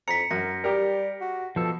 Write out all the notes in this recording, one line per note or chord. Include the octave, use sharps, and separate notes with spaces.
F2 A#5 B6 C#7
F#2 A#4 A#6
G3 G4 A#4
F#4
B2 F3 A4